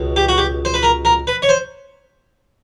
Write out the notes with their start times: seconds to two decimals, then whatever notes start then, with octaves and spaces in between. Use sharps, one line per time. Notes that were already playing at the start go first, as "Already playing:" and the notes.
Already playing: C#2 B2
0.16 G4
0.29 F#4
0.38 G4
0.65 C5
0.74 B4
0.83 A#4
1.05 A#4
1.27 B4
1.42 C#5
1.49 C5